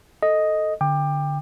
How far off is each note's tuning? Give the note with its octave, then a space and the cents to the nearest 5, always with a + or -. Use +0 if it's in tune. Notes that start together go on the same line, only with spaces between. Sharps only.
A4 +0 D#5 +5
D3 +0 G5 +20 D6 +20